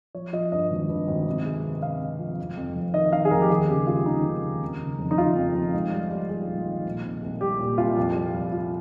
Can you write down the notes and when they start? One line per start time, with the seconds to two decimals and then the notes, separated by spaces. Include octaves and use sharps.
0.14 F3 C#5
0.33 F3 D#5
0.52 G2 D#5
0.70 G#1
0.89 G2
1.08 G#1
1.26 C3
1.45 G#3
1.64 C3
1.82 C3 F5
2.01 C3
2.19 F3
2.38 F1
2.57 F2
2.75 F1
2.94 D#3 D#5
3.12 D#3 F5
3.25 G#4
3.31 F1 A#4
3.41 G4
3.50 D#2 G#4
3.68 C#3 G4
3.87 G#3 F4
4.06 D#2 D#4
4.24 C#3
4.43 D#2
4.61 F2
4.80 C#3
4.99 F1
5.11 D#4
5.18 F1 F4
5.36 F2
5.54 F2
5.74 G#2
5.92 G3
6.11 G3
6.29 G3 G#4
6.48 A#1
6.66 D#3
6.85 A#2
7.04 C2
7.23 C2
7.41 G3 G4
7.59 A#2
7.78 C2 F4
7.97 F2
8.16 G3
8.34 F2
8.52 F2 F4